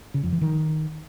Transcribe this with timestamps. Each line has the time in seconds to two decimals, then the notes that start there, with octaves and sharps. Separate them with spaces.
0.14 C#3
0.23 F2
0.32 E3
0.41 D#3